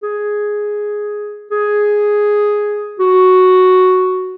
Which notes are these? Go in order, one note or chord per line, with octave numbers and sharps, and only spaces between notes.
G#4
G#4
F#4